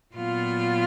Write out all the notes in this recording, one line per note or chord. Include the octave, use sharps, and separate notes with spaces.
A#2 F#3 B3 F4 F5